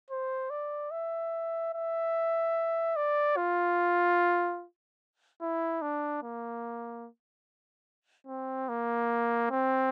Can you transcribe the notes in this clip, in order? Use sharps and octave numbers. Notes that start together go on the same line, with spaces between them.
C5
D5
E5
E5
D5
F4
E4
D4
A#3
C4
A#3
C4